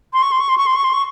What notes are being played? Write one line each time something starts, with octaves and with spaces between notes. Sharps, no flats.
C6
C#6
C6
C#6
C6
C#6
C6
C#6
C6
C#6